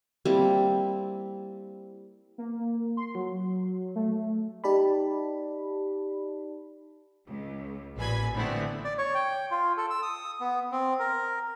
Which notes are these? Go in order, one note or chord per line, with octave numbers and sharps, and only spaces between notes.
G3 A#3 C4 E4
A#3
C6
F#3
A3
D#4 G4 D5 A5 B5
C#2
A1 A#2 B4 G#5 B5 G#6
D3 A3 B3 C4 E4
D5
C#5
G5
F4
A4
E6
D#6
B3
C4
A#4